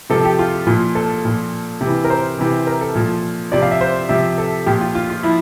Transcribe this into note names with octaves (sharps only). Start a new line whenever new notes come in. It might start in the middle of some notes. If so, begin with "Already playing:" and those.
C3 F3 A4
G4
F4
A#2 F3
A4
A#2 F3
C3
E3
A#4
C5
C3 E3
A#4
A4
A#2 F3
C3 F3 D5
F5
E5
C5
C3 F3 E5
A4
A#2 F3 G4
F4
F4
F4
F3 E4